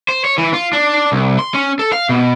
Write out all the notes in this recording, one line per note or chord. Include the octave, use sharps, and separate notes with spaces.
C5
C#5
E3
F4
D4
C2
C6
C#4
A4
F5
B2